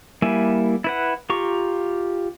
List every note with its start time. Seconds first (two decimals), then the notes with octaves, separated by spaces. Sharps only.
0.22 G3 A#3 E4 E5 G#5
0.84 E4 B4 F#5
1.30 F4 G4 A#5 C#6